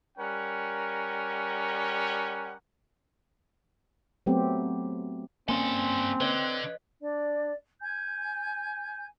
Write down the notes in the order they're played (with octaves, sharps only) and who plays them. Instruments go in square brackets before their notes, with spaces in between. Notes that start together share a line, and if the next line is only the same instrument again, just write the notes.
[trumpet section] G3 C#4 A#4 F#5
[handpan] F#3 A3 B3 C4 G4
[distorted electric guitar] G2 A4 [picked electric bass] A#3 C#4 [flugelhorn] C4 [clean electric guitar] G#5 C6
[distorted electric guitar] D3 [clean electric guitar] B4 C#5 D#5
[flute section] D4 D5
G#5 G6